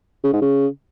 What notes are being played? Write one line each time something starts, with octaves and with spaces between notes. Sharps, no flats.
C#3
G#2
C#3